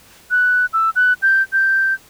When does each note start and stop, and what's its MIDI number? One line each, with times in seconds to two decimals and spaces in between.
0.31 0.66 90
0.73 0.90 88
0.96 1.13 90
1.22 1.43 91
1.53 1.94 91